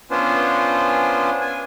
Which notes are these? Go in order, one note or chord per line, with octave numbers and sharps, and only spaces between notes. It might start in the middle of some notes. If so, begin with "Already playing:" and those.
B3 C#4 D4 F4 C5
G#5